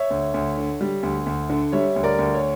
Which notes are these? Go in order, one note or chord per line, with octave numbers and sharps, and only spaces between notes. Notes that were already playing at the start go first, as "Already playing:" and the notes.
Already playing: C#5 E5
D2
D2
D3
G3
D2
D2
D3
G3 C#5 E5
D2
A#4 D5
D2
C#5